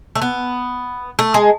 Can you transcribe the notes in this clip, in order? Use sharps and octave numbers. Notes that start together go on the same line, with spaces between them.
A3
B3
A3
G#3